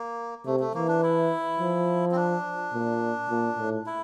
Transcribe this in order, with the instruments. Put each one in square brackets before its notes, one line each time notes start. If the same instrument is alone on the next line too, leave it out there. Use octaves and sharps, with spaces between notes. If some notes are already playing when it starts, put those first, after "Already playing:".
Already playing: [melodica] A#3
[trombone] C3 [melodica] A3
[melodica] A3
[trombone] E3 [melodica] A#3
[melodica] D4
E4
[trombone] F3
[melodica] C4
D4
[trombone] A#2
A#2
A2
[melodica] E4